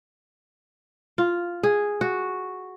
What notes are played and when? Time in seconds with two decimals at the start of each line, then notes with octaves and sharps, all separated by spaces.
1.18 F4
1.63 G#4
2.01 F#4